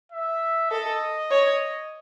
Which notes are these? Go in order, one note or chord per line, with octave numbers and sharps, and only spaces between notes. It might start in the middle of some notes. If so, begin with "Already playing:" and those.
E5
A4 D#5
C#5